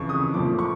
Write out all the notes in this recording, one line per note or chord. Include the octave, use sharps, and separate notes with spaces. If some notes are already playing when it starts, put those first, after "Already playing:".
Already playing: F2 C#3 E3 C#6
D#6
A#2 F3 A3 D6
C#6